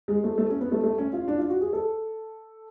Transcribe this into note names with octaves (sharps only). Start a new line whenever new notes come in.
G#3
A3
A3
C#4
B3
A3
A3
C#4
F4
D4
F4
F#4
G#4
A4